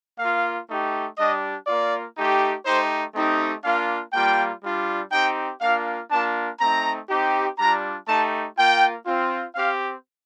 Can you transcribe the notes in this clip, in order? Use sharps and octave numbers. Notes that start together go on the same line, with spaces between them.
A#3 F4 F5
A3 D#4 G4
G3 D4 G4 D#5
A#3 F4 D5
A3 D#4 G4
A3 D#4 G4 C5
A3 C4 D#4 G4
A#3 D4 F4 F5
G3 A#3 F4 G5
G3 D4 F4
C4 D#4 G4 G5
A#3 D4 F4 F5
A#3 D4 F4 A5
A3 C4 D#4 A#5
C4 D#4 G4
G3 D4 F4 A#5
A3 D#4 G4 A5
A#3 F4 G5
C4 F4
C4 G4 F5